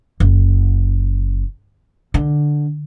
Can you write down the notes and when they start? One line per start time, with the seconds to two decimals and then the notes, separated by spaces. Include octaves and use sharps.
0.20 F#1
2.14 D3